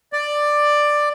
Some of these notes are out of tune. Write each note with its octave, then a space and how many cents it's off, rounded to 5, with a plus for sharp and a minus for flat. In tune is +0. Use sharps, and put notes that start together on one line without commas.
D5 +10